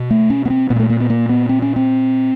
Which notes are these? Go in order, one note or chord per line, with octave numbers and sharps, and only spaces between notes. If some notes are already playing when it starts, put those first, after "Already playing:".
Already playing: B2
A3
C#4
B3
C4
A#2 B3
A#3
A3
A#3
B3
A#3
B3
C4
C#4
C4